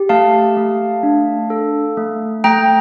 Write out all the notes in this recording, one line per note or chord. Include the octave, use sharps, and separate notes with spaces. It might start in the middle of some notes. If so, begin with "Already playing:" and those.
Already playing: G4
A3 F5 A5
A3
D4
A4
A3
A3 G5 A#5